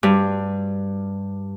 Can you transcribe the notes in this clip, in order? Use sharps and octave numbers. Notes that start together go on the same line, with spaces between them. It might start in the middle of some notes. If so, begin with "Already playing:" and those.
G2